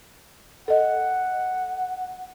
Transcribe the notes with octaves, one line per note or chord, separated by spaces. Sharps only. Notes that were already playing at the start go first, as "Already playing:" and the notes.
A4 D#5 F#5